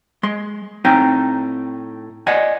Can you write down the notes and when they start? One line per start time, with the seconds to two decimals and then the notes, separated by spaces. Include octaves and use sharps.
0.23 G#3 C6
0.85 A2 C4 D#4 G5 G#5 A#5
2.27 D5 D#5 F#5 G#5